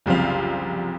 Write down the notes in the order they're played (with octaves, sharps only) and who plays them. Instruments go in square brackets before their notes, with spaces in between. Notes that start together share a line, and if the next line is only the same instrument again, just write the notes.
[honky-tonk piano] F#1 C2 F3 C4 F5